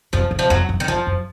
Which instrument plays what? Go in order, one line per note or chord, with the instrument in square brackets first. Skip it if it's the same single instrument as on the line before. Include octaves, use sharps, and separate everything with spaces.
[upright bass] F2 [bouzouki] F3
[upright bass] F#2
[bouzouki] F3
[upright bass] F2 [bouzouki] F#3
[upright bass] F#2
[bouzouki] D#3
[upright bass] F2 [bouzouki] F3
[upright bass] F#2